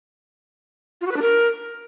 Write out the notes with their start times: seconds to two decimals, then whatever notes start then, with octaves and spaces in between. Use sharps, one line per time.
1.01 F4
1.06 F#4
1.11 B4
1.16 D4
1.21 A#4